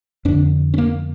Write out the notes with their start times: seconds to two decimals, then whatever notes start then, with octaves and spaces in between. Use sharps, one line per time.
0.25 F2 D3 D4
0.74 C#4
0.78 A#3